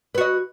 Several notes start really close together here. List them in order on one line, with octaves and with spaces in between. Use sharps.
B4 F#4 D#5